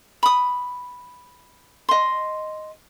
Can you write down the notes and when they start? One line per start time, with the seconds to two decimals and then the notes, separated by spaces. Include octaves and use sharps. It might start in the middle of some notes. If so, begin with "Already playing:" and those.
0.23 B5 D#6
1.89 D#5 C6